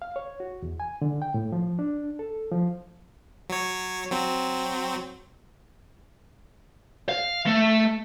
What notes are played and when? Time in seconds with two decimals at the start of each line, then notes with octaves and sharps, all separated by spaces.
0.02 F5
0.16 C#5
0.40 F#4
0.62 E2
0.80 G#5
1.02 D3
1.22 G5
1.34 A2
1.52 F3
1.79 D4
2.19 A4
2.51 F3
3.50 F#3 C#5
4.10 F#3 C4
7.09 F5
7.47 A3